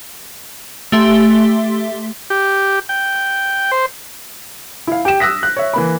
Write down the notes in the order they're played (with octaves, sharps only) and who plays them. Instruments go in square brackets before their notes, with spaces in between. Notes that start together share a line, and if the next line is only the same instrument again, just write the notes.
[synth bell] A3 G4 E5 C6
[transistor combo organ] G4
G5
C5
[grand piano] E4 F5
G4 E7
D#6 E6 F#6 A#6 B6
F#6
C#5 E5
E3 A#3 B5